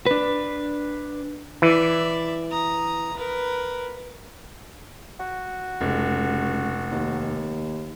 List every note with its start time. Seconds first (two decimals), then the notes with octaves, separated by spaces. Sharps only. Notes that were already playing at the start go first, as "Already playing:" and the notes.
0.06 D4 B4
1.62 E3 D5 E5
2.50 A#5 D#6
3.16 A#4 B4
5.20 F#4
5.81 F1 C#2
6.92 D#2